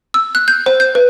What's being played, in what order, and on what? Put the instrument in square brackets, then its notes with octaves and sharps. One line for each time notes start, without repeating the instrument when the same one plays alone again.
[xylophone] E6
F#6
G6
C5
G6
B4